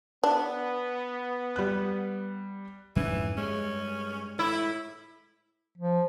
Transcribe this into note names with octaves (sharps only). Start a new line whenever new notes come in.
B3 D4
G3 F#6
F2 G#2 E3 C#4
G2 G#3 C#4
A2 E4
F3